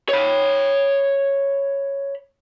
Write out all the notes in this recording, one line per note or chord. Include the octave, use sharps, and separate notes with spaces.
C#5 B5